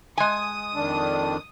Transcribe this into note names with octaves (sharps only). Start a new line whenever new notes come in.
G#3 G#5 D#6
F2 D#3 D4